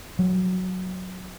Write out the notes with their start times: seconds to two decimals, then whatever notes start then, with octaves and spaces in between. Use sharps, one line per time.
0.19 F#3